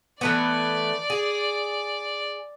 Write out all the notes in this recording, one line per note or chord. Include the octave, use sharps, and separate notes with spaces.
E3 A3 B3 D5
G#4